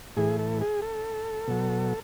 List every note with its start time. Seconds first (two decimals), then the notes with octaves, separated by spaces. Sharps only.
0.17 A2 E3 G#4
0.39 A4
0.61 G#4
0.82 A4
1.47 B2 F#3